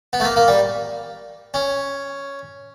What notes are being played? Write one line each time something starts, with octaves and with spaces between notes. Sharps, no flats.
B3
A3
A#3
A#3
G3
C#4